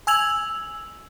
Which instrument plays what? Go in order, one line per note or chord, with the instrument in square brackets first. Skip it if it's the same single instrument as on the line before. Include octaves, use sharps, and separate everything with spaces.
[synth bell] G#5 E6 G#6 F7 F#7